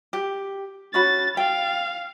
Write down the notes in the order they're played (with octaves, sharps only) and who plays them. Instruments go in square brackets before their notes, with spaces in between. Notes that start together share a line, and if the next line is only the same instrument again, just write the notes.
[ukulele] G4
[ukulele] C#4 F#4 B5 [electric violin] A6
[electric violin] F5 [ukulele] G5